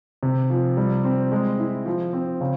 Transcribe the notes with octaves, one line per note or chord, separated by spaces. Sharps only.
C3
F3
G3
C4
G#3
E4
F3
C4
C#3